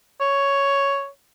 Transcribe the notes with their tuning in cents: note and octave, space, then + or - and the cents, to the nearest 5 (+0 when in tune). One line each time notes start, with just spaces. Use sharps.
C#5 +5